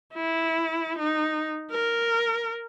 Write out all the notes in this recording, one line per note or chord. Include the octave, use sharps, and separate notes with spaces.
E4
D#4
A#4